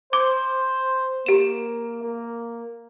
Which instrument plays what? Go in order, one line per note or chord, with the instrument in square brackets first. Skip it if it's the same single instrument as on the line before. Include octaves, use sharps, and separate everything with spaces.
[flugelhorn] C5 [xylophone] D6
[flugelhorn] A#3 [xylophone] G4 E7
[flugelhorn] A#3